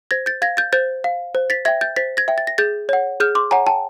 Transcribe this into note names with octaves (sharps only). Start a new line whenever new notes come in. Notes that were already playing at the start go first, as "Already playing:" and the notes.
C5 G#6 A#6
G6 A6
F5 G#6 A#6
G6 A6
C5 G6 A6
F5
C5
A6 B6
E5 G5 G#6 A#6
G6 A6
C5 A6 B6
G#6 A#6
E5 G5
A6
A#6
G#4 G6 A6
C#5 F#5
G#4 F6 G6
C6 D6
C#5 F#5 G#5 A#5
G5 A5